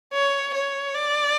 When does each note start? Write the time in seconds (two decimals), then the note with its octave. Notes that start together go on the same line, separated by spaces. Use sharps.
0.13 C#5
0.54 C#5
0.95 D5